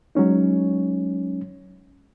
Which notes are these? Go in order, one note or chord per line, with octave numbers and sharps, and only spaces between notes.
F#3 G#3 C#4 D#4